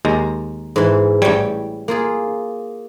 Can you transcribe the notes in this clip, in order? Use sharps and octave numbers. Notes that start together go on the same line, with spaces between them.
D#2 G#3 A#5
G#2 E3
A1 G3 C#5 G5
A#3 F4 G#4